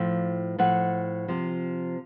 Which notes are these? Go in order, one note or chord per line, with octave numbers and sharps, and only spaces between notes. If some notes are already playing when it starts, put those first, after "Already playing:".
Already playing: A2 F3 F5
A2 F3 F#5
C3 F3